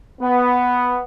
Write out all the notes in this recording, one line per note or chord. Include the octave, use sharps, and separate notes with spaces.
B3